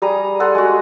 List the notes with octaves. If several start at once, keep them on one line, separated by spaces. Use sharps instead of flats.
G3 G#4 A#5 D#6
G#4 A4 F#5 C6
G#3 F#4